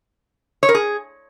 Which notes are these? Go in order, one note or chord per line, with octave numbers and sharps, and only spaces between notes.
C#5
A#4
G#4